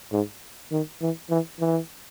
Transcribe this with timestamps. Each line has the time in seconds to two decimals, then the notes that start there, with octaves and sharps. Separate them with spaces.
0.12 G#2
0.71 D#3
1.01 E3
1.30 E3
1.60 E3